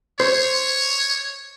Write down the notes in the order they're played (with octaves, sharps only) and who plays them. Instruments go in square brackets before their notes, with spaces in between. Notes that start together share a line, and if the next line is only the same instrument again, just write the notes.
[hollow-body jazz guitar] C5 [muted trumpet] C#5